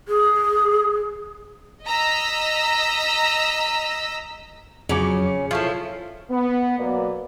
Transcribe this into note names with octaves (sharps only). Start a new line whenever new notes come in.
G#4
D#5 A#5 E6 B6
F2 C#3 F#3 C#4 D6
F3 E4 F4 A4 C#5 C7
B3
B2 F#3 A#3 B4 D5